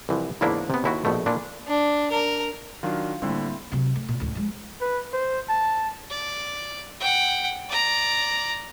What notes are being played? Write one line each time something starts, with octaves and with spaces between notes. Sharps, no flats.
C2 E3 F3
E2 G#2 C#3 A#3 D4 E4
C3 B3
D#2 E4 F#4
A#1 B2 A3
A#2 D4 E4
D4
A#4
D#3 F#3 D4 F4
A2 D3 G3 A#3 C4 E4
C3 F#3
A3
A#2
A1 D2
F3 G#3
B4
C5
A5
D5
F#5 G5
D5 A#5